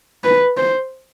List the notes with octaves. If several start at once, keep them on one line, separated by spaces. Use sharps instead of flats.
B4
C5